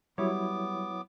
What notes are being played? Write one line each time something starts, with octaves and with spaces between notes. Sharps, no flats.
F#3 G3 B3 E4 C#5 D6